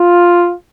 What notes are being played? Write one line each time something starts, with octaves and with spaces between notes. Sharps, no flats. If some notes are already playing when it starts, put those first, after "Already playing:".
Already playing: F4